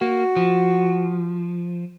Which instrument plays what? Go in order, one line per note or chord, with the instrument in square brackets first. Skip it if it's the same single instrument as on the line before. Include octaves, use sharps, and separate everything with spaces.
[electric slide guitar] A#3 [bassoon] F#4
[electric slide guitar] F3